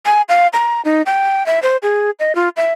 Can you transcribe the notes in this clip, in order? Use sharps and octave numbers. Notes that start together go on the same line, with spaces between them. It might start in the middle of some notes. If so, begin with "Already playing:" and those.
G#5
F5
A#5
D#4
G5
E5
C5
G#4
D#5
F4
E5